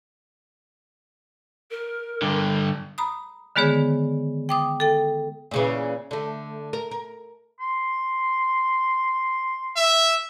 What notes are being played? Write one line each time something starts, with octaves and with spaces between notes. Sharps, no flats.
A#4
G2 D3
A#5 B5 D#6
D3 D#3 G#3 B3 G#4 C#5
G5 D6 D#6
A4 G5
A#2 C#3 E3
D3 A3
A#4
A#4
C6
E5